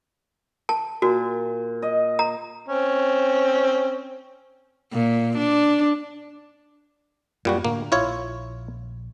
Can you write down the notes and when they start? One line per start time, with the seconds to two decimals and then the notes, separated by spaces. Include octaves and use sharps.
0.69 A5
1.02 A#2 F#4
1.82 D#5
2.19 A#5
2.68 C4 C#4
4.93 A#2
5.38 D4
7.45 F#2 A#2 G3 F#4
7.65 A2 D3 A#3
7.92 A#1 E4 F4 C#5